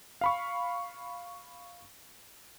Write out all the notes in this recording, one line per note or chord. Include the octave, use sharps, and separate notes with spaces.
F5 B5 C#6